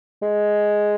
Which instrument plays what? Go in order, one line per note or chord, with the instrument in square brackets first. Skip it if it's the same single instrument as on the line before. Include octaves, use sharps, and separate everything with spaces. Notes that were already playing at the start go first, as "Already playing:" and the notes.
[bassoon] G#3